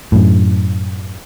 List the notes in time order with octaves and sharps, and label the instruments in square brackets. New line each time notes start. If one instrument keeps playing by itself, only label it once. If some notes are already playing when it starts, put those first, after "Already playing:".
[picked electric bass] F#2 A2